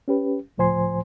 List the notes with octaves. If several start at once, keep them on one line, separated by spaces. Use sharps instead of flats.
C#4 G4 B4
C#2 A2 F3 C5 G#5 C6